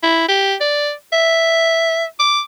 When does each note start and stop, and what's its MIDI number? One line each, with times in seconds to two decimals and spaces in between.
0.03 0.28 64
0.28 0.55 67
0.61 0.92 74
1.13 2.04 76
2.19 2.41 86